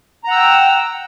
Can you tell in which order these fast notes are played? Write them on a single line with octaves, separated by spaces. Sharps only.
A#5 F#5 E6 G5